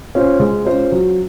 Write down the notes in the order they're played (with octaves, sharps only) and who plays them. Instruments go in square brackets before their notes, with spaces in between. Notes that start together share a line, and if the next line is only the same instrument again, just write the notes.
[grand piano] C#4 F4 C5
G#3
C#4 F4 C5
F#3